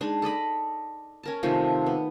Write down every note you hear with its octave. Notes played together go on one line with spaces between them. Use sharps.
G#3 D4 D#4
A4 D5 D#5 B5
C#4 A#4 A5
C3 D#3 F3 A3
B3